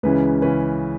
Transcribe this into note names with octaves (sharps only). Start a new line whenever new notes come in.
C#2 C#3 E3 C#4 B4
C#3 E3 C#4 B4